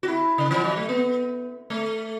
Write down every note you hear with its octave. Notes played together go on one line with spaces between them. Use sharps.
F#4
E4
C#3
E3
F#3
A3
B3
A3